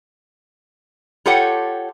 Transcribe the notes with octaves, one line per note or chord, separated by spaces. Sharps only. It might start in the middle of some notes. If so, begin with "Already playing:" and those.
F4 G4 A4 C#5 F#5 G5